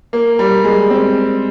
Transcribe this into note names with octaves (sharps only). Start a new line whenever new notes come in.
A#3
G3
G#3
C4